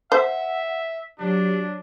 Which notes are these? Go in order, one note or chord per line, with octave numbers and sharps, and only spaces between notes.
C5 E5 F#5
F#3 D4 G4